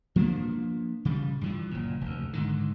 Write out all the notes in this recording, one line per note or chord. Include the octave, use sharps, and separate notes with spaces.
F3 A#3 B3 D4
C#3 F3 G3
G2 E3 F3
F#1 A#2
F1 D2
G#2 D3 D#3